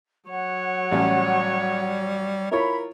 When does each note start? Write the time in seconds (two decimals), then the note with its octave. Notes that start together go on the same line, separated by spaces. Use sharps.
0.29 F#3 C#5 F#5
0.91 A1 G3 C#4
2.51 E4 F4 A#4 C#5 B5